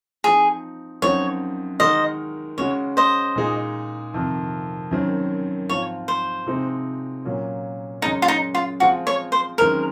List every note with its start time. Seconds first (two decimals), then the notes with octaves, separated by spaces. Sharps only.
0.24 F3 C4 D#4 G#4
1.02 F#2 F3 C4 D#4 F#4 C#5
1.80 D#3 G#3 D#4 F#4 A#4 C5 D#5
2.58 C#3 G#3 C#4 F#4 C#5
2.97 C5 D#5
3.36 A#2 G#3 D#4 G#4
4.14 F2 C3 D#3
4.91 F#2 D#3 F#3 C4
5.69 G#2 F3 C4 F4 C#5
6.08 C5
6.46 C3 F3 G#3 C4 D#4
7.25 A#2 F#3 A#3 C#4
8.02 F#2 C#3 G#3 C#4 D#4
8.22 F4
8.28 D#4
8.55 F4
8.80 F3 G#3 C4 F4 F#4
9.07 C#5
9.32 C5
9.58 F#2 D#3 G#3 C4 A#4